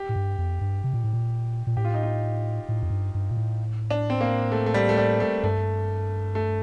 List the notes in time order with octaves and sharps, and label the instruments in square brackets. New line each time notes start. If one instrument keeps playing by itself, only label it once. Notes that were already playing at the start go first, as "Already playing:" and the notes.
Already playing: [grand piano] G4
[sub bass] A2
G2
F2
G2
C3
A#2
A2
A#2
A#2
[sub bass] A2 [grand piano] G4
[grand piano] F4
D#4
F4
[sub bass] A2
F2
G2
G2
A#2
A2
[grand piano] D4
C4
A#3
A3
A3
G3
A3
G3
A3
[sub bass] G2 [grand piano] A3
[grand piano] A3